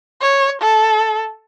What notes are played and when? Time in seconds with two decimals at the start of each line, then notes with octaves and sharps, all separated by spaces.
0.21 C#5
0.61 A4